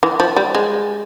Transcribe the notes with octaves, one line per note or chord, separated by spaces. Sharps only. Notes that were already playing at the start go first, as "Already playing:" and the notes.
E3
F3
G3
G#3